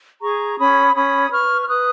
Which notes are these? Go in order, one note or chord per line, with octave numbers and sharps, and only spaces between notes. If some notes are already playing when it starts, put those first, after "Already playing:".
G#4 A#5 C#6
C#4 B5 D#6
C#4 B5 D#6
B4 C#6 F6
F6
B4 D#6 F#6